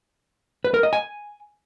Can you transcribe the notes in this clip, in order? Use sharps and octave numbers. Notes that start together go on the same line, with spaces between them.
B4
A#4
D#5
G#5